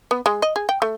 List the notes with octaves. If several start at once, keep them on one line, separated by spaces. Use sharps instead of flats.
B3
G#3
D#5
G#4
G5
A3